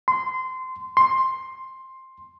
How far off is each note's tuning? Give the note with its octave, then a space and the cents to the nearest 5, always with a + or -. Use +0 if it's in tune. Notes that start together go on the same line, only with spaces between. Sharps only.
C6 -20
C6 +10